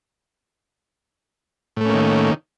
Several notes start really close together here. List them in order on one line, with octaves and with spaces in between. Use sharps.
A2 A3 C#4 A#3 D#3